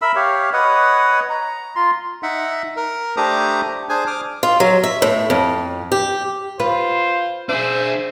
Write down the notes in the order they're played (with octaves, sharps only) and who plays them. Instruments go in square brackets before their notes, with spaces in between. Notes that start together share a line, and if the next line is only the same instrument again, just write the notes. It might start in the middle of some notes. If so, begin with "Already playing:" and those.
[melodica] A#4 E5 B5 E6
G4 C#5 F5
B4 C#5 D#5 F#5
A#5
F4 C6
[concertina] D#4 E5 F#5
A#4
A3 D4 G4 C5 A#5 D#6
D4 G#4 C5 G#5
D6 D#6 F6
[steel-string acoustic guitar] F4
F#3
E5
A2
F2
G4
[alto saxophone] F4 [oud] B4 [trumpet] C5
[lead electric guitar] D4 G#4 [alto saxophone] C5 [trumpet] E5